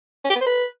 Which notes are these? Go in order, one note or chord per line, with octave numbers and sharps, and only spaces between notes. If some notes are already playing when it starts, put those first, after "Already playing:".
C#4
G4
B3
C5
B4